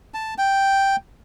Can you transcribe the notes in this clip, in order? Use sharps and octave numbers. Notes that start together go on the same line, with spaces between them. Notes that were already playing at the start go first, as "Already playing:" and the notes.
A5
G5